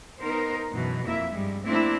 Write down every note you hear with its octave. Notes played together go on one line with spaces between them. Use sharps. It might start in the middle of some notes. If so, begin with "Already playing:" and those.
B3 D#4 A#4 C5
F#2 B2 E3
F2 A#3 E4 E5
G2 G3 G#3
A3 A#3 C4 D4 E4